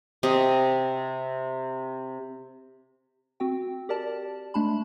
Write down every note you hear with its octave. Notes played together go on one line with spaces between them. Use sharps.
C3 D#5
C4 F#4 G5
G4 A#4 D5 A5
G#3 A3 D4 A5 B5